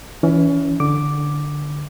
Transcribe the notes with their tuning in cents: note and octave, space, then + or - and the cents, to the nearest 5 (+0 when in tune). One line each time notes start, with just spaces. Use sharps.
E3 +0 C#4 +25
D3 +0 D6 +0